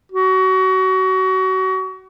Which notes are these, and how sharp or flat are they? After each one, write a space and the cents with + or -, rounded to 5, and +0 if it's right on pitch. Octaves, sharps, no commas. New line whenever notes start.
F#4 +30